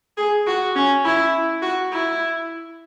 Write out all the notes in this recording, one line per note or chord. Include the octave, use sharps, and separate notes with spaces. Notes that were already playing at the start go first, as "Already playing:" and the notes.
G#4
F#4
C#4
E4
F#4
E4